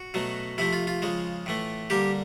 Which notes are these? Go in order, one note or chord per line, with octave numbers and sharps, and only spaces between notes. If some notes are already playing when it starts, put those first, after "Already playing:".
Already playing: F#4
B2 F#3 A3
C3 F3 A3 E4
F4
F4
C#3 F3 G#3
A2 E3 A3
D3 G3 A#3 G4